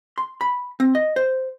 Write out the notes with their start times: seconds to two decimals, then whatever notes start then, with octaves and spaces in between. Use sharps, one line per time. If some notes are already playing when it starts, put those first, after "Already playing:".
0.18 C6
0.41 B5
0.80 C4
0.95 D#5
1.16 C5